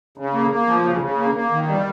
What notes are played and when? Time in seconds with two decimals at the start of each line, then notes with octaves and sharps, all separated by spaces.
0.18 C#3
0.33 A#3
0.51 A#3
0.67 F3
0.84 C#3
1.01 C#3
1.18 A#3
1.35 A#3
1.51 D#3
1.68 G3